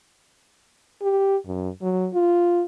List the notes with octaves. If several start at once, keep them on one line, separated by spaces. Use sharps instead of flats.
G4
F#2
F#3
F4